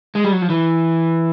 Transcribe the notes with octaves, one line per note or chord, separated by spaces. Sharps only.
G#3
G3
F#3
F3
E3